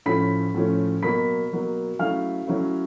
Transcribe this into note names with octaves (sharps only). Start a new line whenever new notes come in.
A2 F3 A3 C#4 B5 B6
A2 F3 A3 C#4
B2 F#3 A#3 B5 B6
B2 F#3 A#3
F#3 A3 C#4 E4 F5 F6
F#3 A3 C#4 E4